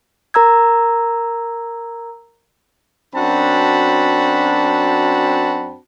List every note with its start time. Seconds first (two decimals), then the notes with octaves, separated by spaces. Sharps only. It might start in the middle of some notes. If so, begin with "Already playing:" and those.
0.34 A#4 A#5 E6 G#6
3.15 F#2 C4 D4 F#4 A5 B5